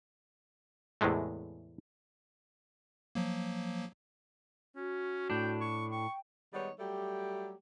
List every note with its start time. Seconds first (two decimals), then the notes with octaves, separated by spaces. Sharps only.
1.01 E2 A2 C3 G#3 A3
3.15 F3 F#3 A#3
4.76 C#4 F#4
5.30 A2 D4 G5
5.61 C#6
5.91 G5 C#6
6.54 D#3 G3 G#3 B3 D#4 C#5
6.79 F#3 G3 A3 G4